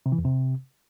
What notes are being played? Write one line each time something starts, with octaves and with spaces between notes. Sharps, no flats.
C3
E3
E2
C3